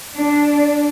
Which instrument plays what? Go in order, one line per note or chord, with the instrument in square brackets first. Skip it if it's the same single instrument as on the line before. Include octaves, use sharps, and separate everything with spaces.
[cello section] D4